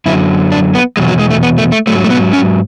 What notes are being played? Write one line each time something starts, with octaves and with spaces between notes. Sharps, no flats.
F#2 D3 F#3 E4
D4
B3
E2 B2 F#3 G#3
F#3
G#3
A3
B3
A3
A3
G#2 F#3 A3
A3
B3
C#4